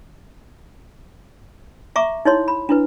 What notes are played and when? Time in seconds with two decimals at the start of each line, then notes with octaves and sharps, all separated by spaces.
1.96 E5 A#5 C#6 D6
2.25 D#4 E4 C#5 C6
2.48 B5
2.69 D4 E4 B4